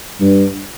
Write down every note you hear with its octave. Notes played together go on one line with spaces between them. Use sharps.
G2